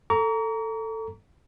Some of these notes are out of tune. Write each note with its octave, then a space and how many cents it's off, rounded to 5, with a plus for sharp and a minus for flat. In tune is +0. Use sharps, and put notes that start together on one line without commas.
A4 +15 A#5 +0 C#6 +45